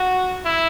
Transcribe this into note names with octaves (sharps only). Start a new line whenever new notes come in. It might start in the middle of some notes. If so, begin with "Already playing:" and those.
Already playing: F#4
E4